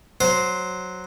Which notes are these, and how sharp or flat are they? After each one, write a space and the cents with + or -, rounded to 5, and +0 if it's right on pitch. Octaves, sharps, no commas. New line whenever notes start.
F#3 +0 C5 +0